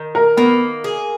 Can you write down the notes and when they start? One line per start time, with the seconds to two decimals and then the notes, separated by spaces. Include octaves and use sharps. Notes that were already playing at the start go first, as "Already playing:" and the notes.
Already playing: D#3
0.15 A#4
0.37 A#3 B3
0.84 G#4